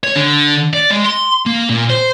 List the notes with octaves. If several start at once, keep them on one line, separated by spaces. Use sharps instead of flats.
C#5
D3
D5
G#3
C6
A#3
A#2
C5